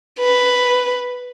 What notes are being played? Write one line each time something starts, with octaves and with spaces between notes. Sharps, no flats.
B4